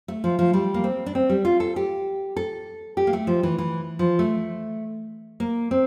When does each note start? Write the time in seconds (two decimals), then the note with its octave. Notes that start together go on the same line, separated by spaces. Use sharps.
0.08 A3
0.24 F3
0.39 F3
0.53 G3
0.74 A#3
0.84 C4
1.06 D4
1.15 C4
1.29 G3
1.45 F4
1.60 A4
1.76 G4
2.36 A4
2.97 G4
3.07 A#3
3.13 A3
3.27 F3
3.43 E3
3.58 E3
3.99 F3
4.19 A3
5.40 A#3
5.71 C4